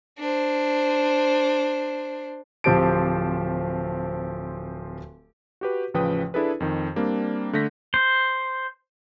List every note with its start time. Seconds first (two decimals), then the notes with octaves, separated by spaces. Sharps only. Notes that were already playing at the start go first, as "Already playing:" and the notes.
0.19 D4 C5
2.64 D1 F3 C4 G4 A5 D7
5.61 F#4 G4 B4
5.94 A1 C#3 F3 B4 G5 D#6
6.34 D4 E4 G#4 A4 B4
6.60 F2 D#3
6.96 G3 A#3 C4 D4
7.53 D3 A3 G6 A#6 B6
7.94 C5